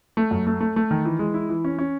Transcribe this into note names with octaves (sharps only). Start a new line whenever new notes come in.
A3
F#2
A3
A3
A3
D#3
E3
G#3
E4
E3
C#4
C#4